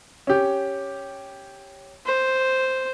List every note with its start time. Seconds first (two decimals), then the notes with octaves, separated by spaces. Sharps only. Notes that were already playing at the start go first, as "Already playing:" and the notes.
0.27 C#4 G4
2.06 C5